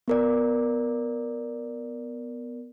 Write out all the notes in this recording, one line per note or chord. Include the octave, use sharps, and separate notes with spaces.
B3 A#4 D5